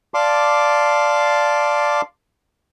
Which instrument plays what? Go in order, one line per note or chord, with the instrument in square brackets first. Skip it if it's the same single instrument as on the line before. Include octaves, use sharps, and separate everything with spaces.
[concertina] D5 F5 A5 C6 D6